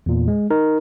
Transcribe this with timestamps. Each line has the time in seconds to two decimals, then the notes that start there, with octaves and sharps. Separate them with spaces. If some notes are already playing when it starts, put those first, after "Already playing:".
0.06 E2 A#2
0.28 G#3
0.50 D#4 A#4